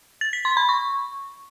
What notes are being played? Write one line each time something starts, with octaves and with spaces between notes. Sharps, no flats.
A6
B6
C6
B5
C#6